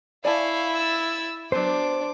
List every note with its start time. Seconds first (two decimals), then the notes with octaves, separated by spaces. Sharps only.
0.25 E4 D5 F5 G#5 A5 C#6
0.75 E6 A6
1.52 F#3 B3 D4 C5 D6